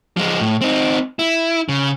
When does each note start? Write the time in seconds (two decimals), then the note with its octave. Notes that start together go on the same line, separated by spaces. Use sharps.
0.17 F3 G#3
0.40 A2
0.61 C4 D#4
1.19 E4
1.69 C#3